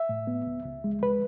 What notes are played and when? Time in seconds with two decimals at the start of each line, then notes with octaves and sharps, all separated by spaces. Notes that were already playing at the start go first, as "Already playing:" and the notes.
Already playing: E5
0.09 A2
0.27 B3
0.47 C#2
0.65 C#2
0.84 G#3
1.02 C#2 B4